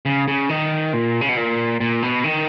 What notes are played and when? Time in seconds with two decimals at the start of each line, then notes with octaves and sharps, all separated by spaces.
0.06 C#3
0.28 C#3
0.49 D#3
0.93 A#2
1.21 C#3
1.29 B2
1.37 A#2
1.80 A#2
2.02 B2
2.24 D#3